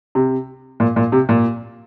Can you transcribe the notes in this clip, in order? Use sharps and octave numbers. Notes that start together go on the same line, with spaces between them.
C3
A#2
A#2
C3
A#2